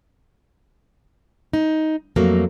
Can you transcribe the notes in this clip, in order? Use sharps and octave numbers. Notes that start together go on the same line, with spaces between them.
D#4
F2 F#3 A3 A#3